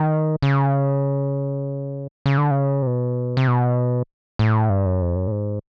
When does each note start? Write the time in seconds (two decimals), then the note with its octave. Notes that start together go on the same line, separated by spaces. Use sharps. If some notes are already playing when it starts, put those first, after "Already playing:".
Already playing: D#3
0.42 C#3
2.26 C#3
2.38 D3
2.51 C#3
2.82 C3
2.86 B2
3.37 C3
3.48 B2
4.39 A2
4.70 G2
4.85 F#2
5.02 F2
5.16 F#2
5.27 A2
5.32 G#2